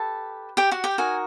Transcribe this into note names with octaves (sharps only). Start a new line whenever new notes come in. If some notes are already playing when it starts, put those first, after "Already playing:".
Already playing: G4 A4 B4 A5
G4 G5
F#4 F#5
G4 G5
D#4 F#4 A#4 G#5